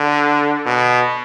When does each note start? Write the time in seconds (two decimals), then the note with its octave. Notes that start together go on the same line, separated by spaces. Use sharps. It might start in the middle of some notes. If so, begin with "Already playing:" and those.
Already playing: D3
0.66 B2